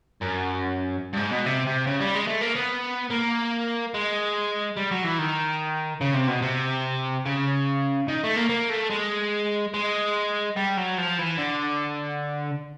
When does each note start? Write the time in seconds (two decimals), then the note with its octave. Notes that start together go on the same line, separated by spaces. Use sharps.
0.22 F#2
1.13 G2
1.18 G#2
1.31 B2
1.46 C3
1.67 C3
1.87 C#3
2.00 G3
2.15 G#3
2.28 A3
2.41 A#3
2.56 B3
3.11 A#3
3.94 G#3
4.77 G3
4.91 F#3
5.04 E3
5.19 D#3
6.01 C#3
6.14 C3
6.28 B2
6.42 C3
7.25 C#3
8.08 D#3
8.24 A3
8.36 A#3
8.49 A#3
8.70 A3
8.90 G#3
9.74 G#3
10.56 G3
10.77 F#3
10.98 F3
11.19 E3
11.38 D3